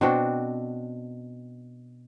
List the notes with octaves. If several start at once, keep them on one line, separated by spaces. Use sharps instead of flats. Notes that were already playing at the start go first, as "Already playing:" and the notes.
B2 C4 D4 F#4